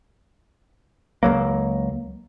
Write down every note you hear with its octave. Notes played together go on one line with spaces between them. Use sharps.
C#2 F#3 A#3